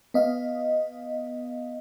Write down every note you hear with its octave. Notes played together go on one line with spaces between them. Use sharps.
B3 D#5 F5